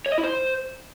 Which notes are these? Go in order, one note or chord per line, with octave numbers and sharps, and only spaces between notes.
C#5
D#5
E4
C5